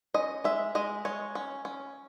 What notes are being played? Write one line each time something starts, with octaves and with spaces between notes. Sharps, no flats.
C#4 D#5
G#3 E5
G#3 D#5
G#3 C#5
C#4
C#4